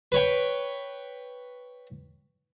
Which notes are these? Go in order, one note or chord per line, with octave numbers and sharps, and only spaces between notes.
B4 C#5 G5